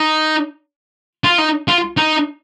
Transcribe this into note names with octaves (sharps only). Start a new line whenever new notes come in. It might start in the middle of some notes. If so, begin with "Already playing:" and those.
Already playing: D#4
F4
D#4
F4
D#4